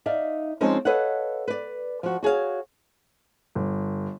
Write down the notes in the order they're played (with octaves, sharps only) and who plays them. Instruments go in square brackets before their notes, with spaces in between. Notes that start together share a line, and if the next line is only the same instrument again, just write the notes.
[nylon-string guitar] D#4 D5 E5 F5
F3 G#3 C4 C#4 D#4
A4 B4 C#5 D#5 F5 F#5
B4 D5
F3 F#4
F#4 G#4 C#5 F5
[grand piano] G1